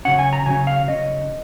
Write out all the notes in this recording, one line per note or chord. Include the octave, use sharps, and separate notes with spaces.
C#3 F#3 C#4 F#5
G#5
A#5
C#3 F#3 C#4 G#5
F5
C#3 F#3 C#4 D#5